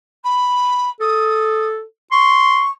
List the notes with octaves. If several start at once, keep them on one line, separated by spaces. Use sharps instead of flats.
B5
A4 D#6
C6 C#6